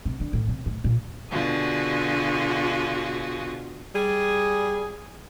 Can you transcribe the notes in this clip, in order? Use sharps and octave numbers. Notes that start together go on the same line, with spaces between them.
C3
D3
A2
C3
A2
A#2
B2 D3 F4 F#4 G#4
G3 G#4